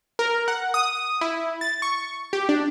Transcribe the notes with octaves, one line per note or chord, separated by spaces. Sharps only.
A#4
F#5
D#6
E4
A6
C#6
G4
D4